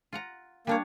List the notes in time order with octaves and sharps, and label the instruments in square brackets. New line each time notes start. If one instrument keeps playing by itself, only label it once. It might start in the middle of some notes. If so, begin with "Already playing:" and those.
[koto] F4 F#5 A#5
[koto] G3 D4 C#5 [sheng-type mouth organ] A#3